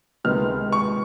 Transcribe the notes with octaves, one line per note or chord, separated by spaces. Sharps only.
C#2 C3 D#3 G#3 B3 F6
C#6